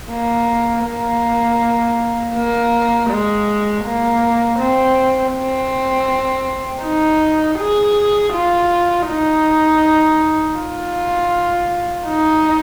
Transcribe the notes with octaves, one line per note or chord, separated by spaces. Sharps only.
A#3
A#3
A#3
G#3
A#3
C4
C4
D#4
G#4
F4
D#4
F4
D#4